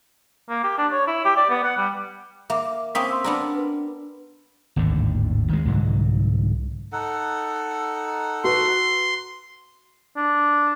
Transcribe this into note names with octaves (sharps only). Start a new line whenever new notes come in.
A#3
G4
D4
C#5
E4
G4
D5
B3
F#5
G3
A#3 E5 D6
A#3 C4 C#4 D#6 B6
C6 E6
B3 D4 A#4
B4
G#1 D#2 A2 D3
D#3 G#3
C2 G#2 D3 F#3
D#4 A4 F#5
F#4 B4 C6
D4